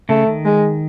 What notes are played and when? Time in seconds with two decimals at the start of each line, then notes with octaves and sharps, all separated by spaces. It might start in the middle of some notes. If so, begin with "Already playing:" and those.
0.09 C#3 A3
0.27 D#3
0.45 G#3